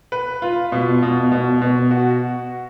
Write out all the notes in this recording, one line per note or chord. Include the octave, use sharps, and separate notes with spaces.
B4
F4
B2
B2
B2
B2
F#4